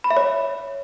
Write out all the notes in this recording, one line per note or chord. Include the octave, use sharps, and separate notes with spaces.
B5
E5
C#5